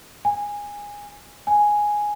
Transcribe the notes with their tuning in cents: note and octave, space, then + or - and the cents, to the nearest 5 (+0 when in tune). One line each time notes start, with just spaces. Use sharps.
G#5 -15
G#5 +0